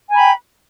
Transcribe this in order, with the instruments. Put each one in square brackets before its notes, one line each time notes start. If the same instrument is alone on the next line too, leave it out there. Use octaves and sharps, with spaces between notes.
[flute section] G#5
A#5
B5
G5